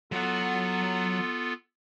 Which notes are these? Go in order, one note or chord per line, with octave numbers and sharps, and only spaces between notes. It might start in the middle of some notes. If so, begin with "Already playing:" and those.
F#3 B3 F4 A4 F#5